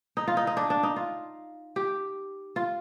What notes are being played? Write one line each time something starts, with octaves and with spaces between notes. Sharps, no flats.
D#4
F4
D#4
D#4
D4
D4
D#4
F4
G4
F4